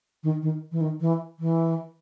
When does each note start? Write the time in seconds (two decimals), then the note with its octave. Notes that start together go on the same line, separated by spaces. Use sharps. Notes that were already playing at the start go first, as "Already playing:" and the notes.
0.23 D#3
0.42 D#3
0.72 E3
0.81 D#3
1.00 E3
1.39 E3